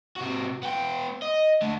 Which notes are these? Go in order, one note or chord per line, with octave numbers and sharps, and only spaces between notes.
C3 F#4
B3 G5
D#5
D3 A3